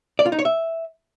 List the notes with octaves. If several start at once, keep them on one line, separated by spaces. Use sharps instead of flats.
D5
F4
D#4
C#5
E5